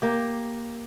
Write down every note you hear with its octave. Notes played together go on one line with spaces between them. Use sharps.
A#3 G4